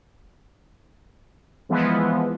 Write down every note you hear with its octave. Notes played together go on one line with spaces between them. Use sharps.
E3 F3 G#3 B3